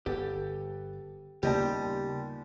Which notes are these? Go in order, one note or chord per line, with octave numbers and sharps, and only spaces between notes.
G1 B3 G4 A4
D#2 A#2 C#3 G3 B3 G4 D#5 A5